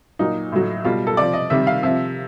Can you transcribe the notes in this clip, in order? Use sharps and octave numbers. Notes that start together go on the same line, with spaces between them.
A#2 F#3 D#4
A2 F#3
B2 G3 F4
A4
C3 F3 D5
D#5
C3 D#3 G3 E5
F5
C3 F3 E5